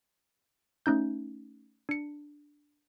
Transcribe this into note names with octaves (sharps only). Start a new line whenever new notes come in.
A3 C#4 D#4 G6
D4 C#7